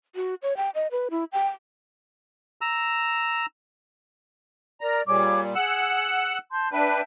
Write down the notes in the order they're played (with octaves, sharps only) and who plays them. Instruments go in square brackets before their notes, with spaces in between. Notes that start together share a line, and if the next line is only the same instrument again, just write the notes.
[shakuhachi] F#4
C#5
G5
D#5
B4
E4
G5
[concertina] A#5 E6
[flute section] A#4 D5 [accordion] A#5
[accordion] A#2 G3 [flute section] G#4 C#5 D6
[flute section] G#4 [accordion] F#5 E6 F#6
[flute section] A5 C6 G6
[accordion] D4 B4 [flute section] E5 G5 A5